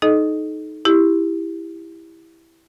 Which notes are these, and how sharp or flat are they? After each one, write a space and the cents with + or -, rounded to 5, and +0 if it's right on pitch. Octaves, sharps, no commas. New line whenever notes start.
D#4 +0 A4 -40 D#5 -10
E4 +0 G4 +10